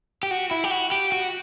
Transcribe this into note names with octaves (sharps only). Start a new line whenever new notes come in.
G4
F#4
E4
G4
F#4
G4
F#4